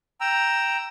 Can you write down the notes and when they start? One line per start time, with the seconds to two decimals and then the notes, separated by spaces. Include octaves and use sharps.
0.21 G5 A#5 E6